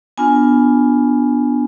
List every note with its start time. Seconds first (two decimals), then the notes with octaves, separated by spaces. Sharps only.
0.17 B3 D4 F4 G#5